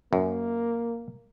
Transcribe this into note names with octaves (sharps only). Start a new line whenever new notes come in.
F#2 A#3